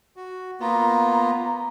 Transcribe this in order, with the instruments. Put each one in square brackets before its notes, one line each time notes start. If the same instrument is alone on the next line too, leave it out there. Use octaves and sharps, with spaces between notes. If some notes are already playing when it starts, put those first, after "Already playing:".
[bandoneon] F#4
[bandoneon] A#3 B3 F4 [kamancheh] A#5